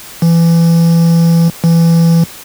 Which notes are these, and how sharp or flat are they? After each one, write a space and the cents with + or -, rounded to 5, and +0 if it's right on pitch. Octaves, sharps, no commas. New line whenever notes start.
E3 +25
E3 +20